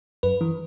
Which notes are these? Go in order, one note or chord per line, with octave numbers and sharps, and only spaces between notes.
F#2 B4
E3